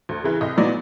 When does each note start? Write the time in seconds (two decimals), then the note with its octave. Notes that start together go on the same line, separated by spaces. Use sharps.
0.09 D2
0.24 C#3 E3
0.41 C2 D#5
0.57 A#2 F#3 B3 D#4 D5